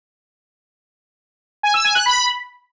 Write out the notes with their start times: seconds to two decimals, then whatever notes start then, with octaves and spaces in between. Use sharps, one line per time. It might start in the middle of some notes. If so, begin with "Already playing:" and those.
1.63 G#5
1.74 E6
1.85 G#5
1.95 F#6
2.06 B5